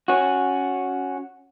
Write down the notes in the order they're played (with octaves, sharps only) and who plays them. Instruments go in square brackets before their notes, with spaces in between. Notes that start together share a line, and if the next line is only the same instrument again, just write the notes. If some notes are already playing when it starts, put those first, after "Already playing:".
[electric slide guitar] C#4 F#4